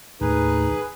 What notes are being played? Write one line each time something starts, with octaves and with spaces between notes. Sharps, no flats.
D#2 A2 D#4 G#4 B4